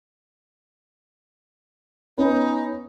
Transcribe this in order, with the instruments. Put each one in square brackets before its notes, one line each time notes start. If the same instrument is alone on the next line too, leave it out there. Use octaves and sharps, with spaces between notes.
[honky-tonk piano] B3 C#4 C#5 [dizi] D#4